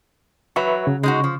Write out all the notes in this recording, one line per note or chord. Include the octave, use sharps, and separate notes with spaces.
F#3 B4 E5 C#6
C#3
G#3 D#4 F#4
F3